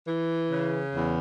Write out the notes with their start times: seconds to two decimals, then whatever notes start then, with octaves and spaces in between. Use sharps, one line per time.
0.07 E3
0.51 C#3
0.95 E2